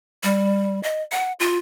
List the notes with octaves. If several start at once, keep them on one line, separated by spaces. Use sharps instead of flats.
G3
D#5
F#5
F4